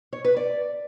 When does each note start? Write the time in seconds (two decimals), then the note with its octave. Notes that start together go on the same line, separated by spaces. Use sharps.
0.13 C#5
0.25 B4
0.37 D5